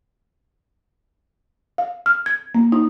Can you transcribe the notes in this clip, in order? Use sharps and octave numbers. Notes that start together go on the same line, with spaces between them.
F5
F6
G#6
A#3
D#4